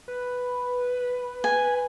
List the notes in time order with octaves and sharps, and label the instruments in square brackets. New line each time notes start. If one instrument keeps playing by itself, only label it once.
[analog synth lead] B4
[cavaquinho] G#5